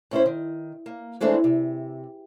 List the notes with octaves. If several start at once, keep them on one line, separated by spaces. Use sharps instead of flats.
A2 C#4 E4 C5
D#3
A#3
E3 G#3 A3 C4 D4
C3